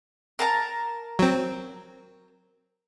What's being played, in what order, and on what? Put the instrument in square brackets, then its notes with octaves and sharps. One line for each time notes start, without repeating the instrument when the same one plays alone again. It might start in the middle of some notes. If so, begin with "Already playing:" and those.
[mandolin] A#4 A5 A#5
[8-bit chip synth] F#3 C4